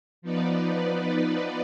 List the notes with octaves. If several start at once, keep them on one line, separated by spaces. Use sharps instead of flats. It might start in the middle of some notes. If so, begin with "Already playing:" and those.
F3 B3 D#4 B4 D5